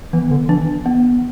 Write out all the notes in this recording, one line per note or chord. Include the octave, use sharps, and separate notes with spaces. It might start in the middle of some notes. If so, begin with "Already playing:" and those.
E3 B3
D3
E3 D4
B3